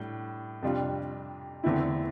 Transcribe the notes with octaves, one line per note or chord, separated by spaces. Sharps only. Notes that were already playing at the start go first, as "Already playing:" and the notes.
Already playing: A2 G3 D4
F2 C3 G3 D4 F4
E2 D3 A3 C4 E4